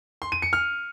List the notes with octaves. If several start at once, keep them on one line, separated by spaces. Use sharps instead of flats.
C6
D#7
C#7
F6